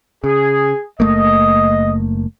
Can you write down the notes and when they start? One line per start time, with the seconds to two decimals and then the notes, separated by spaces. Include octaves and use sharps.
0.24 C#3 G#4
1.00 F#1 A3 A#3 D#5